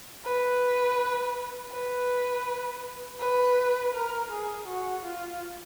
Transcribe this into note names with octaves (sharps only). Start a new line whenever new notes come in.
B4
B4
B4
A#4
G#4
F#4
F4